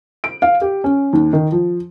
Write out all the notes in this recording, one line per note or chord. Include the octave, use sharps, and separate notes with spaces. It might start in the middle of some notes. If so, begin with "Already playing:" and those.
D7
F5
G4
C#4
D#2
D#3
F3